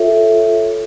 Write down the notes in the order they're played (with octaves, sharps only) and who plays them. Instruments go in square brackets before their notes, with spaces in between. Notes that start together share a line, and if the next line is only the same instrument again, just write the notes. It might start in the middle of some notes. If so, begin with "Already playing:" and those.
Already playing: [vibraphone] F4 A4 C#5 E5